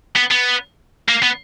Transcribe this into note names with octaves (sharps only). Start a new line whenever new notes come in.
B3
B3
A#3
B3